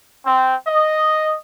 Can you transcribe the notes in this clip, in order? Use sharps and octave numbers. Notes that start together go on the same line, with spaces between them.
C4
D#5